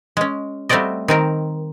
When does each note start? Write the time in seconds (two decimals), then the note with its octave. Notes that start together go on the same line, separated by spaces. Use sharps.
0.17 G#3 C#4
0.69 G3 A3 C4 F#4 D5 D#5
1.08 D#3 C4 A#4